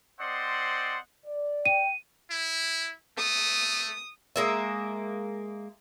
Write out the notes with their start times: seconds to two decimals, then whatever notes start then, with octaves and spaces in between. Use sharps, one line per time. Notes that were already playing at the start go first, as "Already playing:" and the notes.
0.20 C4 C5 D5 D#5 F#5 C6
1.25 D5
1.66 G5 D#7
2.31 E4
3.18 A3 D#6
4.36 G#3 A#3 E5